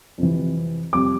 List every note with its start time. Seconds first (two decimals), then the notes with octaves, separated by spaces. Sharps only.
0.18 F2 C3 E3
0.93 F2 C3 G3 D6